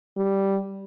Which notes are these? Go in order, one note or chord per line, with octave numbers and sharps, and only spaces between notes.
G3